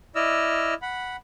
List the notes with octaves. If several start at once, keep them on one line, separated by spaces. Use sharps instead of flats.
E4 D5 D#5 E6 F6
F#5 B5